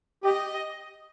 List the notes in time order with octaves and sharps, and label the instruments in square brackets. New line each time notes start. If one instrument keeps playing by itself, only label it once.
[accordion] G4 [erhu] D#5